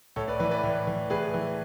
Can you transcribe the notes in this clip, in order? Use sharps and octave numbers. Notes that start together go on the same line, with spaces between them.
A2 A4 C#5
B4 D5
E3 B4 D5
B4 D5
A2
E3
A2 G#4 B4
E3